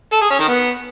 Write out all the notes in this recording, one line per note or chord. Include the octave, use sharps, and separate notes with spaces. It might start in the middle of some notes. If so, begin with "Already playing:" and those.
A4
G#4
C#4
D#3
B3